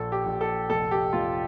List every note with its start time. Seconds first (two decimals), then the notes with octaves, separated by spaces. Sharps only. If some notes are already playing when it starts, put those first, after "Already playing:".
Already playing: A#1 A4
0.12 G4
0.26 A#1
0.41 A4
0.70 F1 A4
0.91 G4
1.13 F1 F4